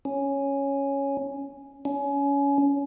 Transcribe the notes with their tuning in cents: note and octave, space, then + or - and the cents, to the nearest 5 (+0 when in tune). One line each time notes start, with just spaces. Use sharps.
C#4 +0
C#4 +25